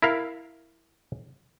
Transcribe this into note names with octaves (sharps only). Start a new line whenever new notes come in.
E4 A#4 F5